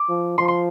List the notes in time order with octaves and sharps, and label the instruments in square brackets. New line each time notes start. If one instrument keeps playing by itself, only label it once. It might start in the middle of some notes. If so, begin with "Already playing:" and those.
Already playing: [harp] D6
[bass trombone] F3
[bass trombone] F3 [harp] C6
[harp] C6